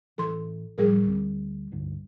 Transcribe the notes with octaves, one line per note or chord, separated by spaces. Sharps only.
A1 E3 A4 C6
A1 A2 F3 G3 G#4 A#4
D2 C4
C#2 G2 D3